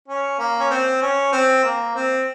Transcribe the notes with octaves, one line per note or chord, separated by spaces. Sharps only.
C#4
A#3
C#4
C4
C#4
C4
A#3
C4